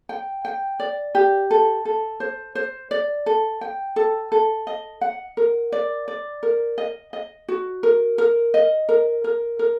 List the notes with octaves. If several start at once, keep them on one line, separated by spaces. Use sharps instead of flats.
G5
G5
D5
G4
A4
A4
C5
C5
D5
A4
G5
A4
A4
D#5
F#5
A#4
D5
D5
A#4
D#5
D#5
F#4
A#4
A#4
D#5
A#4
A#4
A#4